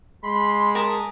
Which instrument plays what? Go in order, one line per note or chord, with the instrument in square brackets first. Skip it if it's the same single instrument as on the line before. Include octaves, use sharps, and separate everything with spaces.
[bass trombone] G#3 [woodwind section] B5 C6
[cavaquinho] A#4 A5 D#6